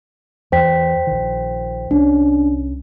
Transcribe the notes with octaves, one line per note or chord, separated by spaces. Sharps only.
E2 C5 G5 B6
A#1 D#3
C2 G3 C#4 D4